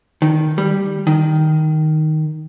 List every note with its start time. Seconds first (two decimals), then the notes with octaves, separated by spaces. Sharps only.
0.22 D#3
0.58 G3
1.07 D#3